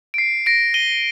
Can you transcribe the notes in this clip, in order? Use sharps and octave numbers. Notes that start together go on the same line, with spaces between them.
D7
C7
A#6 D7
D#7 G7